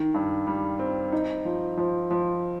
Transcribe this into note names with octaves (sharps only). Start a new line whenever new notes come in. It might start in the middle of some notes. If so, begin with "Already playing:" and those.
Already playing: D#3
G2
G3
C4
D#4
F3
F3
F3